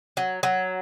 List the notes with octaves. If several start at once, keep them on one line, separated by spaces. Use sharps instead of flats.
F#3
F#3